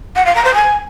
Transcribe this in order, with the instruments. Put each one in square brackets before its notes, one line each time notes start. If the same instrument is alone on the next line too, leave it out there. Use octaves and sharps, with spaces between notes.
[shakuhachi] F#5
F5
A#5
C5
G#5